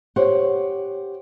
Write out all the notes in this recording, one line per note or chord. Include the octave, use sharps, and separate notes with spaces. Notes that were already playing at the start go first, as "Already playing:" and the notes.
G4 C5 C#5 F#5